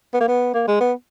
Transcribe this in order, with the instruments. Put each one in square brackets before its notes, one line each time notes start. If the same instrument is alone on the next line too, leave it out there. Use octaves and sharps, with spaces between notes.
[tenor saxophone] B3
A#3
B3
A#3
G#3
B3